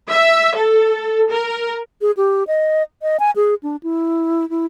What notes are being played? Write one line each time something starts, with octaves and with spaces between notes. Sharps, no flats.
E5
A4
A#4
G#4
G4
D#5
D#5
G#5
G#4
D4
E4
E4